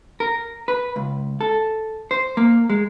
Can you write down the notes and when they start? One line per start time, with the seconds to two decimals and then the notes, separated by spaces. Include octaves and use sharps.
0.20 A#4
0.68 B4
0.96 C#2
1.41 A4
2.11 C5
2.37 A#3
2.70 G#3